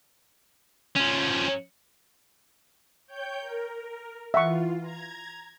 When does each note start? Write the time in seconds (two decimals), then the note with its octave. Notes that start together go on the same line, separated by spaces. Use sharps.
0.96 F3 C#4
3.07 C#5 G5 G6
3.40 A#4
4.34 E3 F4 E5 F#5 C#6
4.80 A#5 G#6